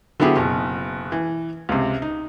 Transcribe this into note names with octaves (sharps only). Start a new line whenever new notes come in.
D3 F#3 B3 E4 G4 G#4
F#1 B2
E3
C#2 C3
D#4